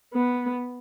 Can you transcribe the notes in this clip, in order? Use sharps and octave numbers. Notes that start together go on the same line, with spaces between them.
B3